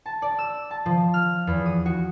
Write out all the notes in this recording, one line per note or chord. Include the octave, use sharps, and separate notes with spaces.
A5
D5
E6
A5
F3
F6
E2
D#6
F#4